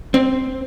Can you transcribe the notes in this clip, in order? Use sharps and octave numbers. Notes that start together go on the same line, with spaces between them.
C4